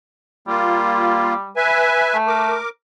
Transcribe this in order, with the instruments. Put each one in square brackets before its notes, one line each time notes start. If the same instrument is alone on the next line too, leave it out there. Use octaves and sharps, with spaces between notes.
[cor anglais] G3 [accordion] A#3 F4
[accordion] B4 E5 G#5
[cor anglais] A3
[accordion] A#4 D6